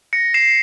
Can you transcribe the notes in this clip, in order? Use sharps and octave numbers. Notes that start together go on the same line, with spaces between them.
A#6 C#7
C7 E7